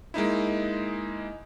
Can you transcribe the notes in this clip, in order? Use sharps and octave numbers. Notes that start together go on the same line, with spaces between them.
G#3 A#3 D#4 E4